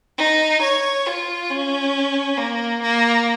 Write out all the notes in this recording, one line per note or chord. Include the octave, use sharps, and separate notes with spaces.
D#4
C#5
F4
C#4
A#3
A#3